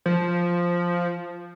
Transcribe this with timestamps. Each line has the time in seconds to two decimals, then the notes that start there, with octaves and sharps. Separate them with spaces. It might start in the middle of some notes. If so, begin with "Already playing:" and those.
0.06 F3